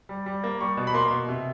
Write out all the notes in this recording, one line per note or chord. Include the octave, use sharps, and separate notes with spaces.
G3
G3
A#3
G3 C#6
B2
B5
A#3 C6
B2
C3